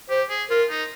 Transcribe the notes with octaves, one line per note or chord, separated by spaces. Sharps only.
G4 C5
G#4
F4 A#4
D#4